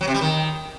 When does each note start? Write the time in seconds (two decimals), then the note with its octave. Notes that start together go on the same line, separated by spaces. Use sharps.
0.01 F#3
0.08 C3
0.14 G3
0.21 D#3